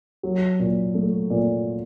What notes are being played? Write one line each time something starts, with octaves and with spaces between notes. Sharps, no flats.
F#3
A#2
A3
A#2